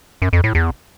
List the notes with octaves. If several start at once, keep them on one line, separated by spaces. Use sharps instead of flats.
F#2
F2
A2
E2